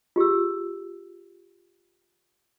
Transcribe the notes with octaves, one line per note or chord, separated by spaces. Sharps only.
F4 G4 G#4 E6